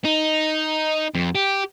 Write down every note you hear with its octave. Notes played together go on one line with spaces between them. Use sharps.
D#4
F2
G4